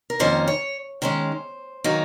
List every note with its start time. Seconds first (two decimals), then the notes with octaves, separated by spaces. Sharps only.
0.10 A#4
0.20 F2 D#3 A#3 C#4 F4 C5
0.48 C#5
1.02 D#3 G#3 C#4 C5
1.84 D#3 F#3 A#3 D#4